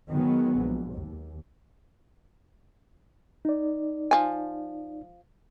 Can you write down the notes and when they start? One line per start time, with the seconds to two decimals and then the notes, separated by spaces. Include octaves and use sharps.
0.10 D#3 F#3 G#3 B3
0.58 A#1
0.97 D#2
3.45 D#4 D5
4.11 F3 G#5